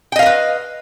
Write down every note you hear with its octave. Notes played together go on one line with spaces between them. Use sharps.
A#4 B4 D#5 F5 G5